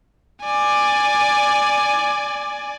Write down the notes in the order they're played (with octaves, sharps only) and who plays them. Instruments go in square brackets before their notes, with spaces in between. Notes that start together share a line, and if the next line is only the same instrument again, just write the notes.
[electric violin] D5 G#5